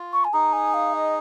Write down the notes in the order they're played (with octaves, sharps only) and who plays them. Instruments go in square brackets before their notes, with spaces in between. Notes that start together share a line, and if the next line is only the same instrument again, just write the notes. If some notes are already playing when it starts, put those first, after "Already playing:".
Already playing: [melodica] F4
[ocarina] C#6
G#5
[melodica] D#4 G#4 [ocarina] A#5
[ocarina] G#5
F5
D#5